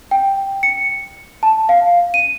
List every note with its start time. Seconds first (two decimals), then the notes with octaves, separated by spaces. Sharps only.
0.11 G5
0.63 C#7
1.43 A5
1.69 F5
2.14 D#7